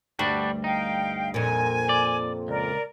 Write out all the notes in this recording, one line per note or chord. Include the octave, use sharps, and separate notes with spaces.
D2 G2 G3 D4 F#4
D#4 F5 G5
F2 A#2 G#5
D5
C#2 A#4 D5